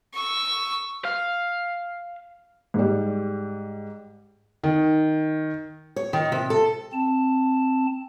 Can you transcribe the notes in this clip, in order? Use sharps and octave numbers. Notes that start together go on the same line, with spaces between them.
C#6 E6
F5
G#2 G3
D#3
C#5
D#3
C3
A4
C4 A5